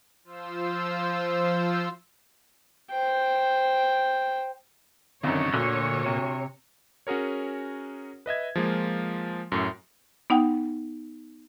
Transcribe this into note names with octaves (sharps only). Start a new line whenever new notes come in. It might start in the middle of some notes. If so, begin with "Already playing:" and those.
F3 F4 C5 E6
C5 G5
C2 F#2 D3 D#3 C#5
D2 A#2 D3
C3
C#4 F#4 G#4 A#4 C#5
B4 D#5 E5 G#6
F3 G#3 A#3 F4
F#2 A2
B3 D#4 F#5 G5